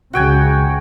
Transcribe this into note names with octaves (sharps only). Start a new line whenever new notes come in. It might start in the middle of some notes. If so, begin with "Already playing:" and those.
C#2 C#3 F#4 G5 G#5